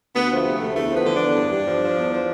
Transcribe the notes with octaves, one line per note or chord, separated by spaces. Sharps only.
D2 B3
F3 A3
C3
A3
D2
E2 A3
F3
B3
D3
D4
E2
G2
G2
F3
F3
E2
F3